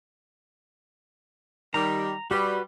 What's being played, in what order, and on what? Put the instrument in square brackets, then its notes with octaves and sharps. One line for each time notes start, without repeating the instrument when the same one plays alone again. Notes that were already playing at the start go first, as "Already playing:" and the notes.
[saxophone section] D#3 G3 [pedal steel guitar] A#5
[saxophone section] G3 [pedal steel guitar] F#4 B4